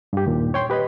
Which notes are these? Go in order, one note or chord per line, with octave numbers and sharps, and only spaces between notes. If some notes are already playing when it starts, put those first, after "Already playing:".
G2 G4
D#2 A#2
C#5 G5 C6
G4 B4 D#5 B5